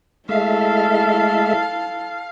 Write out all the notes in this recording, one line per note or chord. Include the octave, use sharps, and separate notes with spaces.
G#3 A3 E4 A4 E5 F5